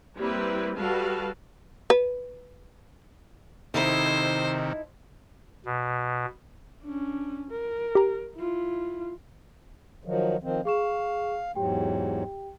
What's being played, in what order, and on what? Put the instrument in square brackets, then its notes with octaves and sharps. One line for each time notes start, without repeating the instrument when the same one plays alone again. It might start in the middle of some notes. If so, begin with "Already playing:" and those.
[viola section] G3 A#3 C4 E4 B4
G3 F#4 A4 B4 F5 A5
[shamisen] B4
[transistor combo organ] C3 D#3 [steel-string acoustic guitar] D#4 E4 A4 [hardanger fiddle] C5
[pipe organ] B2
[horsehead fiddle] C#4 D4
A#4
[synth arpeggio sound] G4 A#5
[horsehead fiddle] E4 F4
[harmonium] D#3 F3 F#3
D#3 F3 C4
[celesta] G#4 C#6 E7 [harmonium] F5
[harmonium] E2 G#2 F#3 [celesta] G4 G5